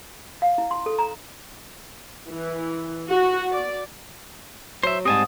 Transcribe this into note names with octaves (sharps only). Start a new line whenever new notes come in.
F5
E4
C6
A4
A#5
E3
F#4
D5
F#3 C5 E5
G#2 G3 C4 G#5 A5 D#6